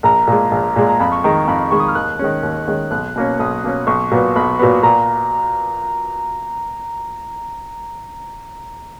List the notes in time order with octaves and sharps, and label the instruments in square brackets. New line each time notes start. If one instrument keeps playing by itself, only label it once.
[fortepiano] A#1 [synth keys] A#5
[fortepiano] A#2 G#3
A#1
A#2 G#3
[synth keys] A#5
[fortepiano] F2 [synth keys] B5
[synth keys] C#6
[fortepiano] D#3 G#3 [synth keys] A#5
[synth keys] A#5
[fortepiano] F2 [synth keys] B5
[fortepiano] D#3 G#3 [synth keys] C#6
[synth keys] D#6
F6
[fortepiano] D#2 [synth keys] F#6
[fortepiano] D#3 G#3 C#4
D#2
D#3 G#3 C#4
[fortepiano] B1 [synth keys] F#6
[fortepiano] B2 A#3 C#4
[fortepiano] B1 [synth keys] D#6
[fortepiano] B2 A#3 C#4
[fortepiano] B1 [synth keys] C#6
[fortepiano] A#2 F#3 B3
[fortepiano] B1 [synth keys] B5
[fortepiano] A#2 F#3 B3
[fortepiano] A#2 [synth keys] A#5